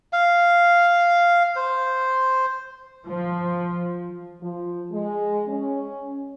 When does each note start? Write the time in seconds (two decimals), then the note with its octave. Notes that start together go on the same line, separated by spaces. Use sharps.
0.13 F5
1.56 C5
3.06 F3
4.41 F3
4.92 G#3
5.48 C#4